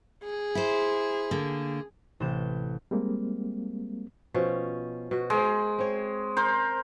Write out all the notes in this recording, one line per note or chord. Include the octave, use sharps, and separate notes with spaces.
G#4
E4 C5
D3 A#3
A1 C3 G6 E7
G3 G#3 A#3 C4
B2 F3 C#4
B2 F#4
G#3 A#4 C5
C4 C#5
A#4 C5